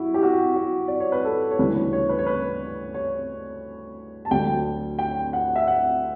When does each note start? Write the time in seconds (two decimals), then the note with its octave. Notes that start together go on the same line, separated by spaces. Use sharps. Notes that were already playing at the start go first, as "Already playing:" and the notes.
Already playing: G2 E4 F#4
0.14 G4
0.23 F#4
0.56 F#4
0.88 D5
1.00 C#5
1.12 B4
1.24 A4
1.51 C#5
1.59 D2 C#3 E3 G3 B4
1.76 C#5
1.93 C#5
2.09 B4
2.19 C#5
2.26 B4
2.94 C#5
4.25 A5
4.31 D2 D3 F#3 G5
4.99 G5
5.33 F#5
5.56 E5
5.68 F#5